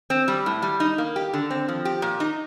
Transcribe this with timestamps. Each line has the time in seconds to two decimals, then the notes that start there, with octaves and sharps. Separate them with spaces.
0.10 C4
0.28 G3
0.46 A2
0.62 G3
0.80 D#4
0.98 A#3
1.16 G4
1.33 D3
1.51 C4
1.68 F3
1.85 G4
2.02 A#2
2.20 D#4